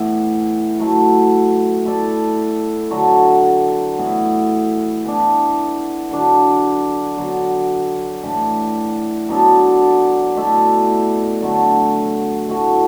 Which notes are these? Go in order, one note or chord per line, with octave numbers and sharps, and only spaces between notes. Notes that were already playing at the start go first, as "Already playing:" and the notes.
Already playing: A2 E3 B3 E4
F#3 A3 E4
A3 E4 A4 D5
D3 F#3 D4 F#4
A2 E3 B3 E4
E3 B3 D4
D3 F#3 D4
D3 F#3 B3
A2 E3 D4
F#3 B3 D4 A4
B2 A3 E4 D5
D3 F#3 A3 F#4
A2 A3 F#4